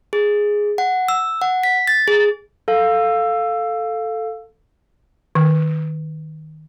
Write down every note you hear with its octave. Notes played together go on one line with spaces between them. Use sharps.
G#4
F#5
E6
F#5
B6
A6
G#4
A4 F5
D#3